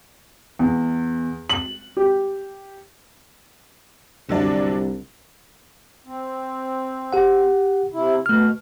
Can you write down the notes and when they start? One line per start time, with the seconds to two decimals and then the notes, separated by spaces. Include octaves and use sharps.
0.59 E2
1.50 F#7
1.97 G4
4.29 C2 D3 F#3 D4
6.06 C4
7.13 G4 F#5
7.94 C3 E4
8.26 B2 A3 F6